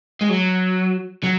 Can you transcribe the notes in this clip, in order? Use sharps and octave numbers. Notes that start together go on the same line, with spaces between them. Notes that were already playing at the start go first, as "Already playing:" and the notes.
G#3
F#3
F#3